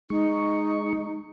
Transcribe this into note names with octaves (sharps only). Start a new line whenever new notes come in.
G#3 D#4 C#6